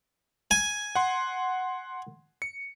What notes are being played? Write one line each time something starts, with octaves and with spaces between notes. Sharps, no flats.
G#5
F#5 C6
C#7